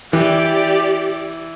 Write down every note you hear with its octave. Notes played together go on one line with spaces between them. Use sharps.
E3 G4 D5